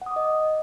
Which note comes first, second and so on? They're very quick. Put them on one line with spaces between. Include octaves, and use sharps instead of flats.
F#5 D#6 D6 D#5